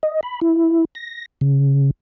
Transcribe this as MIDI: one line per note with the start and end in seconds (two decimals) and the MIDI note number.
0.03 0.21 75
0.23 0.40 83
0.41 0.85 64
0.95 1.26 94
1.41 1.91 49